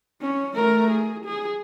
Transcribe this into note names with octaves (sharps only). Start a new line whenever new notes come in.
C#4
A3 A#4
G#4
G#4